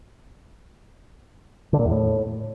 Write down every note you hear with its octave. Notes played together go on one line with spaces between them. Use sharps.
D3
A#2
E2
A2